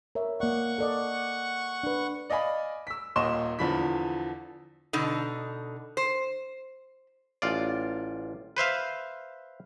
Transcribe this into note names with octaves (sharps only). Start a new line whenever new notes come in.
A#4 C#5 E5
A#3 D5 F#5 C#6
A4 D5 D#5
D4 B4
D5 D#5 F5 G#5 B5
E6 B6
D#1 D#2 D#5 C6 E7
E2 D3 E3 F3 B5 B6
B2 D3 D#4
C5
A1 F4 D5
B4 C5 E5 F5